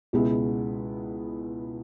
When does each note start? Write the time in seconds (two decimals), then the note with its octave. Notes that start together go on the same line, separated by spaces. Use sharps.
0.13 C#2 B2 G#3 B3 E4